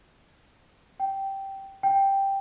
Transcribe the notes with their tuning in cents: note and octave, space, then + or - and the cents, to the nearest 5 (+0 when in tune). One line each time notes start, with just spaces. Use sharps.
G5 -10
G5 +0